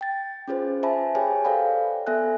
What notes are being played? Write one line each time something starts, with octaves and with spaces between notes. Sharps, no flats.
G5 A6
C#4 F4 G#4 B4 C5
C5 E5 G#5 A5 B5
G4 G#4 B4 C#5 G5 G#5
A4 C5 D5 F5 G5 B5
B3 A4 E5 G#5 F#6